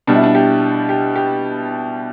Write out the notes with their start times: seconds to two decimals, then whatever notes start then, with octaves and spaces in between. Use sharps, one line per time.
0.07 B2 G3 D4
0.15 E4
0.23 D4
0.35 G4
0.89 G4
1.16 G4